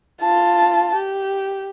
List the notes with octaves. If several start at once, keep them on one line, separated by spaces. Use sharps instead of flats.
F4 A5
G4